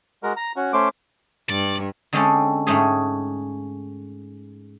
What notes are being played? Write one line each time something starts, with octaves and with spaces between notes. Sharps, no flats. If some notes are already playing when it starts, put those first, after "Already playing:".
G#3 F#4 A#4
A#5
C#4 F#4
A3 C#4 C5 D6
G2 D5
D3 G#3 C4 C#4 G4 A4
G#2 A3 C#4 G4 G#4